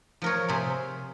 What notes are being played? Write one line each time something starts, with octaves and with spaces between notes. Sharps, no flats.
F3 A#4 C#5
C3 G#4 C5